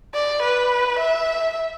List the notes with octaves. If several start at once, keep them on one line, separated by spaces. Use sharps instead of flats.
D5
B4
E5